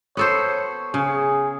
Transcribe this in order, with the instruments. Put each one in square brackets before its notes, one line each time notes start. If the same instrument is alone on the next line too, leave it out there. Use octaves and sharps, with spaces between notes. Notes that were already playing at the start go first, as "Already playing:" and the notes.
[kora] B3 A4 C5 [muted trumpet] C#5
[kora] C#3 [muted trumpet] G#4